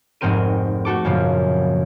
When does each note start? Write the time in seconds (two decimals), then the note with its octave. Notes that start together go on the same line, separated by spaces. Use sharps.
0.21 F1 G#2 G#3 C4 A#4 D#7
0.85 A3 F#4 A4 D6
1.05 F#2 A#2 C#3 F3